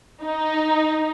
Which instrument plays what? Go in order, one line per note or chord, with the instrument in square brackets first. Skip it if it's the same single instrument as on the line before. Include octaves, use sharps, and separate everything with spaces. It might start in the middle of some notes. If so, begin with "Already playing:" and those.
[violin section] D#4